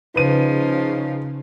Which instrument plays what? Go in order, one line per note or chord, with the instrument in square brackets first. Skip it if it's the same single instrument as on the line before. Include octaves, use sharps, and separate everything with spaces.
[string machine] C#3 [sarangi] F3 [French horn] D#4 [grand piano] B4 D#7